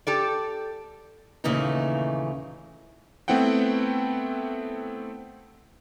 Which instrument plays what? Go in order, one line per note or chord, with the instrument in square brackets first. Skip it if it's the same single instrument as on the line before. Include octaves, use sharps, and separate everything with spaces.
[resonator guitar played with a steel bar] G4 A4 D5
[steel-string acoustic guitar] D#2 A#2 C#3 E3 A3 D#4
[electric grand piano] A3 B3 C4 E4 F#5 G5